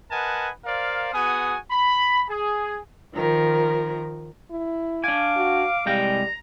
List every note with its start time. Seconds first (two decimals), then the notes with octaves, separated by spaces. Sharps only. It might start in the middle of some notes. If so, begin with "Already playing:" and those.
0.11 A#4 B4 D#5 F#5 G#5 A5
0.65 A#4 C5 D5 F5
1.14 B3 F#4 G#4 G#5 D#6
1.71 B5
2.30 G#4
3.14 D#3 F3 A#4
4.51 E4
5.04 D4 F5 G#5 D6
5.37 F#4
5.86 C2 G3 G#3 G5 A#5